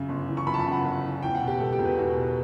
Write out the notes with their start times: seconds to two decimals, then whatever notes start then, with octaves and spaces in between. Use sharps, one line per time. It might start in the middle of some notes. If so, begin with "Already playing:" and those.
Already playing: F#2 C#3
0.09 G1
0.28 E3
0.37 C#6
0.47 F#2 B5
0.54 A5
0.59 B5
0.66 C#3
0.72 F#5
0.84 G1
1.03 E3
1.22 E2 G5
1.35 F#5
1.41 B2
1.48 G4
1.60 E1 A4
1.73 G4
1.79 E1
1.85 B4
1.98 E2 F#4
2.17 B2